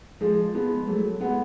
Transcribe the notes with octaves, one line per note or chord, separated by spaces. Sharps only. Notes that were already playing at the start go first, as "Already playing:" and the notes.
F3 G#3 G#4
G#3 B3 G#4
F#3 A3 G#4
G#3 B3 F#5